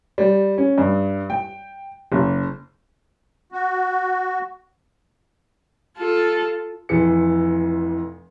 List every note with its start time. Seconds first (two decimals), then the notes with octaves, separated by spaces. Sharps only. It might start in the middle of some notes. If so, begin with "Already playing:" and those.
0.18 G3
0.58 C#4
0.78 G2
1.30 G5
2.12 F#1
3.52 F#4
5.98 F4 A4
6.89 F1 F2 E3 C#7